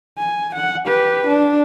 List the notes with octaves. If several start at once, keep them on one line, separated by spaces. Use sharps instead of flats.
G#5
F#5
G4 B4
D4